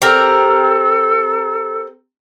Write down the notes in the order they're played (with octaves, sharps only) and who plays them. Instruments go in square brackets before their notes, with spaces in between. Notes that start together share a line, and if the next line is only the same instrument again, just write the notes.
[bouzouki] C4 G4 A#4 [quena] A4